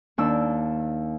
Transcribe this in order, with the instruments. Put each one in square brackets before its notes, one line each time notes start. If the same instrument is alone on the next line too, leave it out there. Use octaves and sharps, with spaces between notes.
[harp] D#2 D4 E6